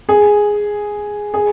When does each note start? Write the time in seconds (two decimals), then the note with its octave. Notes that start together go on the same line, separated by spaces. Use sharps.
0.09 G#4
1.34 G#4